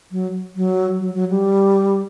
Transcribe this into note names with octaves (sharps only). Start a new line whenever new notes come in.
F#3
F#3
F#3
F#3
G3